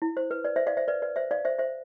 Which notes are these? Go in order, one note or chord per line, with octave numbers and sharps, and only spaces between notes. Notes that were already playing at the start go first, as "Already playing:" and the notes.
E4
C5
B4
B4 D5
C5 E5
D5 F5
C5 E5
B4 D5
B4 D5
C5 E5
D5 F5
C5 E5
C5 E5